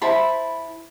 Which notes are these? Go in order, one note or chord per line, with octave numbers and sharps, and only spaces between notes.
E4 C5 A5 B5